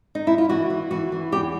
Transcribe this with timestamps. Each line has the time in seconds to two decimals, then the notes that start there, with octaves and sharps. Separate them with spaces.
0.15 D#4
0.27 E4
0.38 F4
0.49 E3 F#4
0.70 E3
0.91 E3 F#4
1.12 E3
1.32 E2 G4